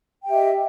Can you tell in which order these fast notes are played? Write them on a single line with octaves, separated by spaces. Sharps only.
G5 G4 E5 D#5